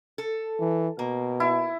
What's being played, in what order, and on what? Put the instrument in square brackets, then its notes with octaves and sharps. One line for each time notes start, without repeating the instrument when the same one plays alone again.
[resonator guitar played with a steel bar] A4
[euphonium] E3
[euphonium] B2 [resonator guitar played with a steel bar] A#3
[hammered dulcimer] E4